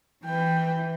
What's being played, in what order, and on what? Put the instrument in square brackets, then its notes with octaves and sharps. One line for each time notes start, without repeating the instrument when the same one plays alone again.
[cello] E3 [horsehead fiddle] B4 G5